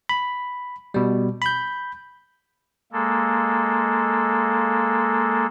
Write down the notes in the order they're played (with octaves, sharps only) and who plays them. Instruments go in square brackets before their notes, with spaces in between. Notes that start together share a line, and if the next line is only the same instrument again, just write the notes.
[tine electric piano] B5
B2 G3
B5 G6
[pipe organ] G#3 A#3 A4